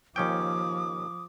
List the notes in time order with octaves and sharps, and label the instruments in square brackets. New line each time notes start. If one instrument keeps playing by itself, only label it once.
[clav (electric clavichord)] D#2 C#4 G5 [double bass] F3 [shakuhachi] D6 [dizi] D#6